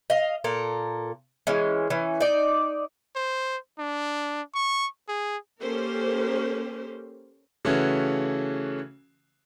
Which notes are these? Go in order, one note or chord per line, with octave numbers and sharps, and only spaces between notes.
D#5 F5
A#2 A4 A#4
E3 G#3 C#4
E3 C#4
D#4 D5
C5
D4
C#6
G#4
A#3 C#4 G4 A4 A#4 C5
C#3 E3 A3 C#4 F#4